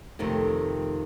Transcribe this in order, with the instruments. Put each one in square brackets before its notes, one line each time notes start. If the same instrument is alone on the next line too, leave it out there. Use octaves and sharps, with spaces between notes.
[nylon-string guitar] F2 C3 D#3 A3